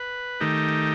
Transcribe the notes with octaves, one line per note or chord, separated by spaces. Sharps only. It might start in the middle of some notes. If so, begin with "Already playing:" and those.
Already playing: B4
D#3 A3 D#4 G4